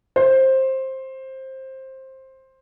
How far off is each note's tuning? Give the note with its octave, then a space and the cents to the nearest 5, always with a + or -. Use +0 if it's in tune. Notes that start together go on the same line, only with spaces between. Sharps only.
C5 +15